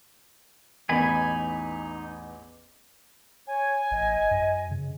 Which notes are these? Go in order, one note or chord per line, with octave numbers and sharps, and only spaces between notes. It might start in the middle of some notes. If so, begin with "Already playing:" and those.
A1 E2 D#4 G#5 B5
C#5 G#5
A1 D#5
F#2
C#3